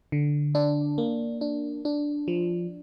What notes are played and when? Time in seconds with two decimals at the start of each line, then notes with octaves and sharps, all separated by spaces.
0.12 D3
0.55 D4
0.98 A#3
1.41 D4
1.85 D4
2.28 F3